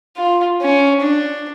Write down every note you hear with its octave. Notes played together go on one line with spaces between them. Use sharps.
F4
C#4
D4